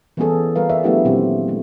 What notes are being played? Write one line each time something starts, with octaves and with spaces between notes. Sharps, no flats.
E3 G3 B3 C#4 G#4 A4
G3 A#4 B4 F5
G#4 D5 E5
F#3 A3 B3 D4 E4 G4
A#2 D#3 F#3 C4 F4 G4
G#3 A3